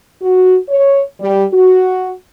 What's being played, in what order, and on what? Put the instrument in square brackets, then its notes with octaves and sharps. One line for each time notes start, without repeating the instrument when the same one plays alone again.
[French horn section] F#4
C#5
G3
F#4